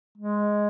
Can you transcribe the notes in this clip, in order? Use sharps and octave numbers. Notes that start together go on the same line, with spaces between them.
G#3